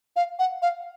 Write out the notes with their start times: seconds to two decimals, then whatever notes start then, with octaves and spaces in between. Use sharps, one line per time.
0.16 F5
0.39 F#5
0.62 F5